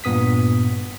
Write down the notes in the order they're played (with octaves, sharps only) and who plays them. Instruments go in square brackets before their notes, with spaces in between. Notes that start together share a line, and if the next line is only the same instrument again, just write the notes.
[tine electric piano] G2 A#2 B3 D#6 B6